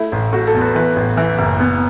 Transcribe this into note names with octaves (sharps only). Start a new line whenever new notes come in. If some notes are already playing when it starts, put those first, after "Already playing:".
Already playing: A3 E4
A1
A3 F#4
A4
E2
B4
E3 B4
A1
E3
F#1
B3